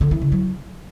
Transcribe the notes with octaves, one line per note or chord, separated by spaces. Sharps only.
D3
E3
C#3
F#3